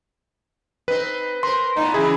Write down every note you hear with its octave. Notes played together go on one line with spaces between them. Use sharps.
C4 D#4 B4 C5
A#4 C5 C6
A2 B3 D#4
C#3 E3 F#3 E4 G#4